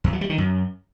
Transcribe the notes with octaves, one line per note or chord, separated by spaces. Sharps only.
E2
F#3
G3
D#3
F#2